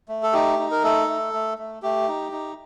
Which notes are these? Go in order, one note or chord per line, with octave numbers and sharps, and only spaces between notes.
A3
A4
D#4 G4
D#4
A#4
A3 A4
A3
A3
A3
A3 G4
D#4
D#4